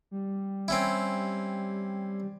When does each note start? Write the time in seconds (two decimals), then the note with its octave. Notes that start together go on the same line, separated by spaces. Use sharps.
0.11 G3
0.68 C4 C#4 E4